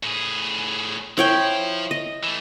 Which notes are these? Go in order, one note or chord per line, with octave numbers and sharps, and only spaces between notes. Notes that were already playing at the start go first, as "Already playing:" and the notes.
A2 G#4
F3 E4 C#5 G5
D#5
E3 A3